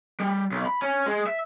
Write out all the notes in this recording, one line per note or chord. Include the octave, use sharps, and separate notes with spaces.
G3
B1
B5
C#4
G#3
E5